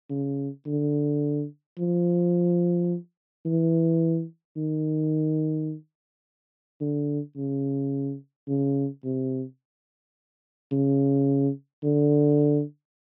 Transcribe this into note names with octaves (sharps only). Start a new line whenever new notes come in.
C#3
D3
F3
E3
D#3
D3
C#3
C#3
C3
C#3
D3